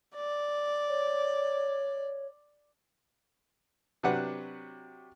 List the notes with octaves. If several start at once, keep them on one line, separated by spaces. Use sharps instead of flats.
D5
C#5
C3 F#3 D4 B4 F#5